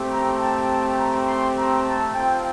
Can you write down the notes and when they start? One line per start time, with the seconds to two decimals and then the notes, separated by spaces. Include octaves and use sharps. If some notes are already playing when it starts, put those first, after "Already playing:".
Already playing: A3 C4 G4
0.09 A#5
0.38 A5
0.67 A5
0.97 A#5
1.27 C6
1.56 A#5
1.85 A5
2.14 C4 F4 G5